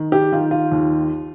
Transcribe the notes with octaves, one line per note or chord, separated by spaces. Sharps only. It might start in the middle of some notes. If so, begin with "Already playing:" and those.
Already playing: D#3
G4
D#3 F4
F4
D#2